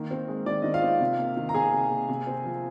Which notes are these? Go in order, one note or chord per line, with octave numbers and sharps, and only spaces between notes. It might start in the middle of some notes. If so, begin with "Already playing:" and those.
Already playing: D#3 A#3
C4
G#3
D#3 D5
D#3 D#5
F4 F5
C4
C3
A#3
D#3
A#5
C3 G#4 G#5
C3
A#3
C3
C4
F3